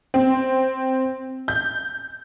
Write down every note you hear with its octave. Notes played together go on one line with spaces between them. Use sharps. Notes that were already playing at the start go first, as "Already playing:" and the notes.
C4
G6